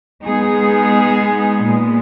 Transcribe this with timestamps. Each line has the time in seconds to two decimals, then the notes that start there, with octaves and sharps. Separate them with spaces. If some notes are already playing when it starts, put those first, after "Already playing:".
0.24 G#3 B3 D#4 G#4
1.63 A#2 G#3 B3